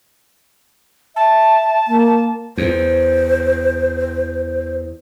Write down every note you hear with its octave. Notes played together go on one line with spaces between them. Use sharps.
E5 A5
A#3
E2 C5